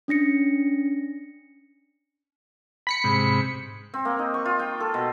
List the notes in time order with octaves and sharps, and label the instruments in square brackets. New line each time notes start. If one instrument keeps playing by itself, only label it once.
[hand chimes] C#4 D4 A#6 C#7
[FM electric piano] B5 B6 C#7
[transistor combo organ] G#2 C3
[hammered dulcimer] C4
A#3
D#4
C#6
F4
G5
A4
B2